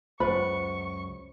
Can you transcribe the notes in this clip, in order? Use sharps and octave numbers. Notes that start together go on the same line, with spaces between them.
C#2 F#2 F4 B4 C5 B5 C#6